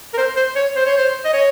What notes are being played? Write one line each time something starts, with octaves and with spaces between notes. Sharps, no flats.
A#4
C5
C5
C#5
C5
C#5
C5
D#5
C#5